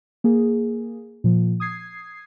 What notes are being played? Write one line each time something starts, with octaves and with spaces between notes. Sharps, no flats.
A#3 G#4
A#2 F3
D#6 G#6 C7